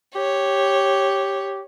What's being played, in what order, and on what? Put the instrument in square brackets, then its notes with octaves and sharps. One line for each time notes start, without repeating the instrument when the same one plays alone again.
[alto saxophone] G4 [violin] C#5